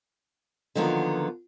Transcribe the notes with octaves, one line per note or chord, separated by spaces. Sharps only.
D3 D#3 F3 F#3 A#3 B3